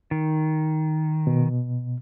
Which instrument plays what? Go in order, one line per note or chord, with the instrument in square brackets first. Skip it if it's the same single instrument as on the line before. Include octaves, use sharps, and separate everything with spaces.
[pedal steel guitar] D#3
[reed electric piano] B2